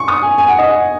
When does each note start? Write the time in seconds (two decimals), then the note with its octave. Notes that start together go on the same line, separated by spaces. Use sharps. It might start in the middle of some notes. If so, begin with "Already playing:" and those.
Already playing: C#6
0.08 D#6
0.22 G#5
0.38 G#5
0.48 F#5
0.58 D#5
0.69 F#5